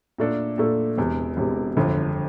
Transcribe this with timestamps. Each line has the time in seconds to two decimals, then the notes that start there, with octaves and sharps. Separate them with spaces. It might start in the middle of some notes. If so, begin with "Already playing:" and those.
0.18 A#2 A3 D4 A4
0.58 A#2 A3 D4 A4
0.98 E1 E2 C3
1.37 E1 E2 C3
1.77 G1 F2 D3